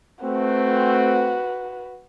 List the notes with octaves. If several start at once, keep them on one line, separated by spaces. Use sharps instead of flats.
A3 C4 F#4 B4